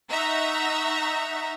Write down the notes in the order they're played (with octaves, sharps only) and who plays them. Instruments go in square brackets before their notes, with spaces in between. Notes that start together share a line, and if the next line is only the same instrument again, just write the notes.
[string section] D#4 E5 F#5 A#5 C#6